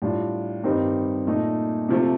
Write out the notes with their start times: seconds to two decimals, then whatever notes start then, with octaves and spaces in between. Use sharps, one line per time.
0.02 A2 G3 D4 F4
0.63 G2 D#3 G3 C4 D#4
1.27 A#2 A3 D#4
1.89 C3 F3 A3